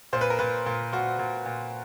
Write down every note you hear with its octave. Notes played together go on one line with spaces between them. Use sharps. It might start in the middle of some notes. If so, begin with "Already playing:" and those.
A#2 C5
B4
A#4
A#2 B4
A#2
A#2 F#4
A#2
A#2